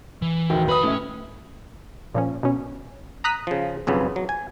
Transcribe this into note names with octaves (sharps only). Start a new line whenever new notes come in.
E3
D1 D#3 G5
F2 B4 B5 D#6
A2 C#4 E4
A#2 F3 C#4
B2 C#4
A#5 D#6 F#6 B6
C#3 F3
B1 F2 C#3 B3
F#3
G#5